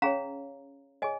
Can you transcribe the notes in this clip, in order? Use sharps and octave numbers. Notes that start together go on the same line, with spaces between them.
C#4 G#4 C#5 F5 A#5
G#4 C#5 D#5 G#5